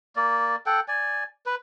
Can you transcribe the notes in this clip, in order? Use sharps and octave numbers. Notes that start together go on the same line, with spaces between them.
A#3 D5
A4 F#5 G5
D5 G#5
B4